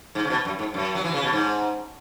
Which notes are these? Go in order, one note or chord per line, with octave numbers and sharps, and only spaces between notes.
G#2
C#3
B2
F#2
G#2
F#2
F#3
E3
C#3
B2
G#2